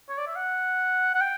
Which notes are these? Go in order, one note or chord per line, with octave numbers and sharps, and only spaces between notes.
C#5
D5
E5
F#5
F#5
G5